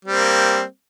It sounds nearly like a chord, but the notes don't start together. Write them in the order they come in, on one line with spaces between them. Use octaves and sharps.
G3 C4 A#3